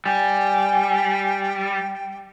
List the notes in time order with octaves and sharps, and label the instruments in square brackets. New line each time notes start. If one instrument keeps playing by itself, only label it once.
[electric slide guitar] G3 [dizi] G5 [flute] G#5